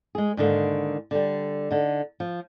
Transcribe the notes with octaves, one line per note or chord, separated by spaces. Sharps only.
G#3 G#4
G#2 D3 D#3 A#3
D3 G3
D3 D#4
F3